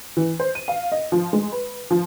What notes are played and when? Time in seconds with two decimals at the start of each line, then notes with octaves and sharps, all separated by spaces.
0.17 E3
0.40 C5
0.55 D#7
0.68 F5
0.92 D#5
1.12 F3
1.33 G#3
1.52 B4
1.91 F3